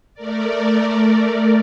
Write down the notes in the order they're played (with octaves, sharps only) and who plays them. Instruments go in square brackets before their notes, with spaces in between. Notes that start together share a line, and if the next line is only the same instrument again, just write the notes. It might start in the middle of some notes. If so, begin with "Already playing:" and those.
[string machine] A3 A#4 D5